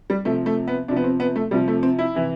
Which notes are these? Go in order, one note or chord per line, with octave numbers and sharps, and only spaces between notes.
G3
C3 F3 A3
A3
B3
C3 F3 D4
B3
C4
B3
A3
C3 F3 G3
A3
C4
E4
C3 E3